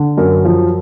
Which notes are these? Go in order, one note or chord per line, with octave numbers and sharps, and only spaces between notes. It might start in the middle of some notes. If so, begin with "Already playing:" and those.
Already playing: D3
F#2 A#4
F3